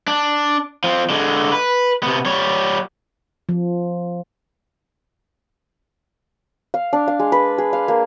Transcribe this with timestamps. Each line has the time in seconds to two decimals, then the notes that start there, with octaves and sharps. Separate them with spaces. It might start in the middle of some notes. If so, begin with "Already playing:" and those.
0.08 D4
0.84 F3 C4
1.10 D3 G#3
1.52 B4
2.03 C3 B3
2.26 G3 C#5
3.49 F3
6.74 F5
6.93 D4
7.08 F5
7.19 G#3
7.32 B4
7.58 G#4
7.73 F5
7.88 A#3